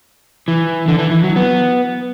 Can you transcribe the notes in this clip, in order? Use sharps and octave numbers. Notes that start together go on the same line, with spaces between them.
E3
D3
E3
E3
F#3
B3